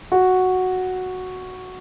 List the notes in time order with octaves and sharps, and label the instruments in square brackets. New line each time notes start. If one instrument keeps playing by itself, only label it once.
[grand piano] F#4